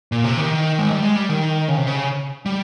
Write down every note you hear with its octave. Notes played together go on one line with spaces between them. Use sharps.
A#2
C3
D#3
G#3
G3
G#3
G3
D#3
C#3
C3
C#3
G3